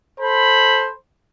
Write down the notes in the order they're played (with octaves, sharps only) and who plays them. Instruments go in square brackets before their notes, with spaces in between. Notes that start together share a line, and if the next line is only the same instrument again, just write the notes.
[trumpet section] A4 C5 B5